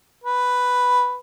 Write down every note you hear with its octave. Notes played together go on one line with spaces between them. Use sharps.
B4